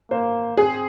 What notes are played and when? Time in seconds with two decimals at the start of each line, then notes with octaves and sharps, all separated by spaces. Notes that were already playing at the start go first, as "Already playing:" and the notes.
0.11 A#3 C5
0.57 C4 G#4